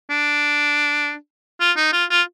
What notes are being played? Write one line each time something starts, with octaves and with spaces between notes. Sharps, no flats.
D4
F4
D#4
F4
F4